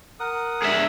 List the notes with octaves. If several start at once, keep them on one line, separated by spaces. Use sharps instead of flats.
A#4 F#5 D#6
G#3 D4 G#4 E5